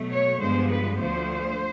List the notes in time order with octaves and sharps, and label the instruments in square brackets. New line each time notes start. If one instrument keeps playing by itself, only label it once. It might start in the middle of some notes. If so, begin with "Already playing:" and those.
Already playing: [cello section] B2 F#3 A3
C#5
G2 D3 F3 G#3 B3 C5
B4
D2 D3 F3 A3 C5